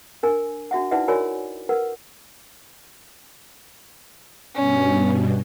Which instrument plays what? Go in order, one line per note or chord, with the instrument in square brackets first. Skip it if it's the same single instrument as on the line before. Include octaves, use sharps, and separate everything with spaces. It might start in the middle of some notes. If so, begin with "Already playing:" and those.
[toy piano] D4 A#4 G#5
D4 F#4 E5 F#5
D#4 E4 B4 D5 E5 F#5
F#4 A#4 C#5 D5 G#5 B5
A#4 B4 F#5
[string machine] G2 B2 [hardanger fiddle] C#4